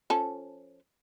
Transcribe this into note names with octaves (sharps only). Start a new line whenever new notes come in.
F3 C#4 A4